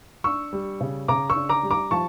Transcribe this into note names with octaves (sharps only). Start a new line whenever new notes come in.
D4 C#6 E6
G3
C#3
C#3 A#5 D6
C#6 E6
D4
A#5 D6
G3
A#5 D6
F3 A5 C#6